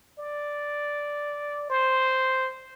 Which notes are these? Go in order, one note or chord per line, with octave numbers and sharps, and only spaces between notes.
D5
C5